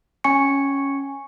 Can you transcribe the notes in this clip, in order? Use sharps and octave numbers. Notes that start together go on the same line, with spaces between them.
C#4 G#5 C#6 C#7